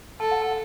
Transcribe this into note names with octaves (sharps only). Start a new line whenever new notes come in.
A4 A5
F#5
A5